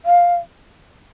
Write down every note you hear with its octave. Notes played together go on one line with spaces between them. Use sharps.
F5